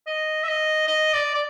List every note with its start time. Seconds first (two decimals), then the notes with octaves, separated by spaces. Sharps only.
0.07 D#5
0.43 E5
0.48 D#5
0.87 D#5
1.14 D5
1.34 D5